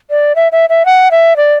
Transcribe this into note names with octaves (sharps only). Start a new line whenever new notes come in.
D5
E5
E5
E5
F#5
E5
D5